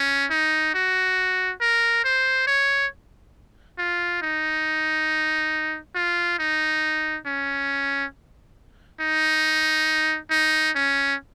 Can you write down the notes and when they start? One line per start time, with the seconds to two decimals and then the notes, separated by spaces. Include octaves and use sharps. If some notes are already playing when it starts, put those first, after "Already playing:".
Already playing: C#4
0.31 D#4
0.74 F#4
1.61 A#4
2.04 C5
2.47 C#5
3.79 F4
4.22 D#4
5.95 F4
6.39 D#4
7.27 C#4
9.00 D#4
10.31 D#4
10.75 C#4